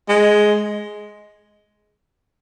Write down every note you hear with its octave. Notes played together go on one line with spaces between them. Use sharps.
G#3